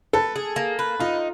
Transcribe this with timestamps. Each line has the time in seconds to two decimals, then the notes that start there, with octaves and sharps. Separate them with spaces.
0.13 A4 B4
0.36 G#4
0.56 A#3
0.79 B4
1.00 D#4 F4